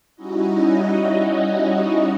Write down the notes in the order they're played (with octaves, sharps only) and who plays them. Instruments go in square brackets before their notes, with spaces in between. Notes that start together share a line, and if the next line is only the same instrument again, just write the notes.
[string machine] G3 C#4 D#4 E4 F#4 D#5